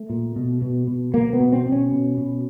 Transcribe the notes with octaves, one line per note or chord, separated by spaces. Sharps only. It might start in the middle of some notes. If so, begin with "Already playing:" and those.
Already playing: A3
A#2
B2
B2
B2
B2 A#3
B3
B2
C4
B2
C#4
B2
B2